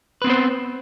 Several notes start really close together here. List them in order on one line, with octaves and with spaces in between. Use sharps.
B4 C4 B3 C5